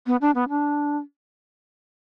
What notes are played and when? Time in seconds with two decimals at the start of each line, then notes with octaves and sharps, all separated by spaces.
0.06 B3
0.21 D4
0.35 B3
0.49 D4